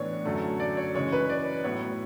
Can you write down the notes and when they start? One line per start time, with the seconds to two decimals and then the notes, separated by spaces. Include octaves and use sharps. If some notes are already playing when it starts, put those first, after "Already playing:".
Already playing: A2 E3 B3 D4 C#5
0.26 F#2 D3 A3
0.60 D5
0.77 C#5
0.94 C#3 E3 G#3 C#5
1.12 B4
1.29 D5
1.64 A2 F#3 B3 E4 C#5